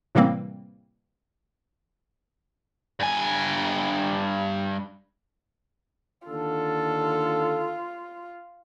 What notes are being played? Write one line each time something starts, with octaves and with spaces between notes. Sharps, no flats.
A2 C3 E3 G3 A#3 C4
G2 G#5
D#2 D3 F4 A4